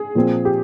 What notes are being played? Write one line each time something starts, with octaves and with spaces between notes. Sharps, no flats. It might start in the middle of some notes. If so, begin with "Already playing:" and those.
Already playing: G#4
A#2 F3 C4
G4